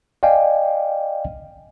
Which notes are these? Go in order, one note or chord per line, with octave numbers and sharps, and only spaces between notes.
D5 D#5 F5 G5 G#5